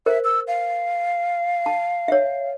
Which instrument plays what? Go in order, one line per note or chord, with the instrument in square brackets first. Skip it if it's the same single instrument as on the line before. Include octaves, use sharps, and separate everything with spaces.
[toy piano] A#4 C5 [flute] E5
[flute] E6
F5
[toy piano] A5
C#5 E5